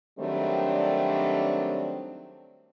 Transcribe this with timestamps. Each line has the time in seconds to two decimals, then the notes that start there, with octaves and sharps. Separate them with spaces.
0.19 D#3 F#3 G3 A3 C4 D4